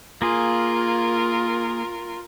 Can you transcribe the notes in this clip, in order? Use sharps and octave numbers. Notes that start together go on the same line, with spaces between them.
A#3 F4 G#4 A#4